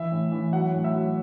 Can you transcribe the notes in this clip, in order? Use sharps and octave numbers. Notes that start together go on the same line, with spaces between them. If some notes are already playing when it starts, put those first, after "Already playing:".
Already playing: E3 E5
A2
E3
F#3 F#5
A2
E5
F#3